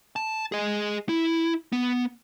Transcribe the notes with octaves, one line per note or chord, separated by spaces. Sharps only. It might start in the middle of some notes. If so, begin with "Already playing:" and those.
A5
G#4 D#5
E4
B3